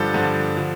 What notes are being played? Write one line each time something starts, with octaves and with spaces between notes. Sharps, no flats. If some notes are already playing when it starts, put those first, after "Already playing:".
Already playing: G2 D3 F3 G4 A4
G2 D3 F3
D3 F3